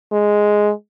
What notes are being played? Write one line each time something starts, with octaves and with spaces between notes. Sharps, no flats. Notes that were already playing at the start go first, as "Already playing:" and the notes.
G#3